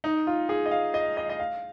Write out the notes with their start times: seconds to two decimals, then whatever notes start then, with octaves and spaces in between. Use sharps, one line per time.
0.04 D#4
0.27 F4
0.49 G#4
0.66 D#5
0.71 F5
0.94 D#5
1.17 D#5
1.29 D#5
1.39 F5